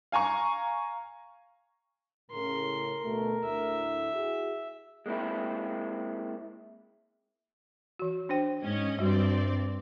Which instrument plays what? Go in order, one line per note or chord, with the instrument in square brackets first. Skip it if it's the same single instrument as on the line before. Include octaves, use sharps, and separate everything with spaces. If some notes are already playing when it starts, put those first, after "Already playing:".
[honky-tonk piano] F5 G#5 A#5 C#6
[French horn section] A2 C#3 [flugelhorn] A#4 [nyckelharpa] C6
[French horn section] D2 B2 A3
[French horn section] D2 A2 [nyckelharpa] E5
[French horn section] E4 F#4 G#4
[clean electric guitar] G#3 A#3 C4 E4
[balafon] E3 F#4
D4 C5 G5
[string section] G#2 C#4 D#5
[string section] G2 C4 D5 [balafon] G3 F#4